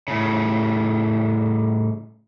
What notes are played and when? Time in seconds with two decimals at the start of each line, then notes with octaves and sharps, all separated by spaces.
0.08 A2 C#3